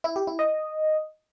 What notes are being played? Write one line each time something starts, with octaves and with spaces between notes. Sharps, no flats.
E4
G4
E4
D#5